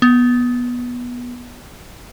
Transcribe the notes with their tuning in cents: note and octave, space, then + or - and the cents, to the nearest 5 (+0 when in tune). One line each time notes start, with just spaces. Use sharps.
B3 -15